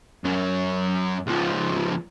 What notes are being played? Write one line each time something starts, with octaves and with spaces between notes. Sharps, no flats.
F#2 F#3
C#2 F3